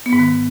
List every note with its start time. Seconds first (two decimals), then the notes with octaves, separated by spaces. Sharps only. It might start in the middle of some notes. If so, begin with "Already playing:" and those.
0.06 B3
0.13 G#2
0.19 D#3